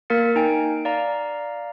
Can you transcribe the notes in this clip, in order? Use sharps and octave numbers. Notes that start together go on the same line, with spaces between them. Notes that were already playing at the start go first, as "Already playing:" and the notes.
A#3 A#4 F5 A6 C#7
D#4 G5 G#5 D7
D5 F5 A#5